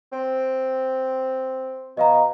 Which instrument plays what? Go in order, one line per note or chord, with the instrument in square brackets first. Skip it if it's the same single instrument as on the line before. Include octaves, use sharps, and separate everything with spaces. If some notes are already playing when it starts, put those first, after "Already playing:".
[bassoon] C4
[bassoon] B2 [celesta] D#5 F5 A#5